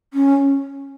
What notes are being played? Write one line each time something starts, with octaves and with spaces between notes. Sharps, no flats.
C#4